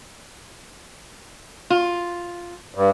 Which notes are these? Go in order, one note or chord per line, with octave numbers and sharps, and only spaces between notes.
F4
G2